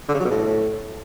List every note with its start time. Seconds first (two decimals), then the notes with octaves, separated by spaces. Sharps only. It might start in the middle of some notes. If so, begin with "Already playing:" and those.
0.09 D3
0.14 C#3
0.20 F#3
0.25 B2
0.31 A2